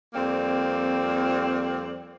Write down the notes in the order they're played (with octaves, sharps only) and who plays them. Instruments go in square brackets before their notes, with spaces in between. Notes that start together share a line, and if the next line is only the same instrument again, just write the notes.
[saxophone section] F2 G3 A#3 C4 D5